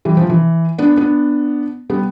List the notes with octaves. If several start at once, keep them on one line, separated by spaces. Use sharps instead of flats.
E3 G3
F3
E3
B3 D4
B3 D4
G3 B3